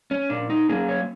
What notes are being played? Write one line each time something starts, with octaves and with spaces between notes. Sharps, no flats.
C#4
A#2 D4
D#4
F#3 A#3 C#4 G#4
C#5